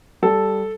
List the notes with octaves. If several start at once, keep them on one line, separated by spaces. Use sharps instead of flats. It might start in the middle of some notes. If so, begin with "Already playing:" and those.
G3 A4